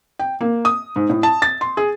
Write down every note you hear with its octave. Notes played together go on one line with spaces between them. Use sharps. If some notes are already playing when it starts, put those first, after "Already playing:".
G5
A#3
D#6
G#2
A2
A5
A6
C6
G#4